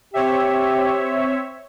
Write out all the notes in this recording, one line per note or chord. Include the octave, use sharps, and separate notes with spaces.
C4 G4 C#5 E5